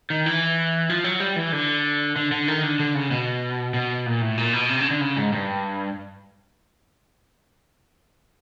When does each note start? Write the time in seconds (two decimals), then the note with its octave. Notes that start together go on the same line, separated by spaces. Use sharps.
0.10 D#3
0.26 E3
0.90 F3
1.04 F#3
1.20 G3
1.36 E3
1.52 D3
2.16 D3
2.32 D3
2.48 D#3
2.63 D3
2.79 D3
2.95 C#3
3.11 B2
3.74 B2
4.06 A#2
4.21 A2
4.38 A#2
4.53 B2
4.69 C3
4.80 C#3
4.90 D3
5.01 C#3
5.17 G#2
5.33 G2